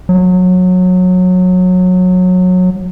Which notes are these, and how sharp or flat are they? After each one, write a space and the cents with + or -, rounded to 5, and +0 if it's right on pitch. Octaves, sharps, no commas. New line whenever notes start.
F#3 -20